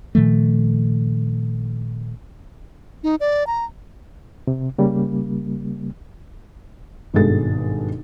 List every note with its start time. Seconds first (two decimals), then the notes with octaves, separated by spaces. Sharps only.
0.15 A#2 D#3 F3 A3
3.03 D#4
3.20 D5
3.47 A#5
4.47 C3
4.78 C#3 G3 A#3
7.14 G#1 G2 B2 G#3 A4 A6